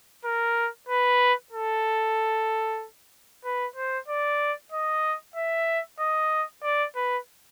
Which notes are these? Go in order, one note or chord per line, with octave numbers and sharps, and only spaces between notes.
A#4
B4
A4
B4
C5
D5
D#5
E5
D#5
D5
B4